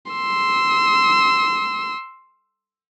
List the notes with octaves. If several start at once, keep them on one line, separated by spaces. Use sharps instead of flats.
C6 E6